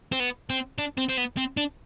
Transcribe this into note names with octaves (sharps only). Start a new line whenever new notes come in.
C4
B3
C4
D4
C4
C4
B3
C4
D4